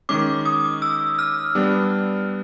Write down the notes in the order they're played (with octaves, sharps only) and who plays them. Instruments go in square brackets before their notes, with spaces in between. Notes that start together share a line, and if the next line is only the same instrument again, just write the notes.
[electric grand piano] D#3 G#3 C#4 [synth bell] D6
[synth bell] D#6
E6
F6
[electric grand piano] G3 B3 D4